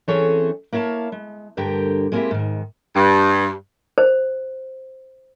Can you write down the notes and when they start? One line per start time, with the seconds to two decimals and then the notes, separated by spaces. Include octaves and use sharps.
0.08 E3 C4 C#4 G#4 A4 C#5
0.73 A#3 E4 C#5 F5 A5
1.12 G#3
1.57 D2 G2 D3 G4 A#4 G5
2.12 G#3 A#3 C4 C#4 E4 G4
2.31 G#2 D#3
2.96 G2
3.98 C5